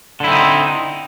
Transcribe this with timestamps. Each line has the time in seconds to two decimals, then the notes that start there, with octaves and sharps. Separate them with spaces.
0.20 D3
0.24 E4
0.28 C4
0.32 D#4